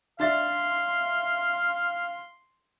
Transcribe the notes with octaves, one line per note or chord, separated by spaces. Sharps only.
D4 E5 F5 C6 A6